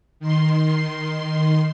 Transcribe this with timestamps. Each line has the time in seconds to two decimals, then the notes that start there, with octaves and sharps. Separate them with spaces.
0.20 D#3 C6